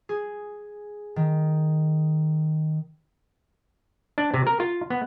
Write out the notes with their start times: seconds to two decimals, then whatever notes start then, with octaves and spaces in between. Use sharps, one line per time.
0.09 G#4
1.16 D#3
4.18 D4
4.34 C3
4.47 A#4
4.60 F4
4.90 B3